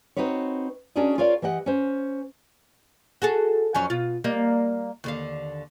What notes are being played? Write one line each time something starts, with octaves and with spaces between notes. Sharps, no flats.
C4 D#4 F#4 B4 C#5
C#4 D4 F#4 G#4 A#4 D#5
F4 A#4 C#5 D5 F5
E3 G4 D#5 F#5
C#4 C5
F#4 G#4 A4
F2 F#3 C#4
B2 F4
G3 A#3 D#5
D#2 D3 F5